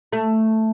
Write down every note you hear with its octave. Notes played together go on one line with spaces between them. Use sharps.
A3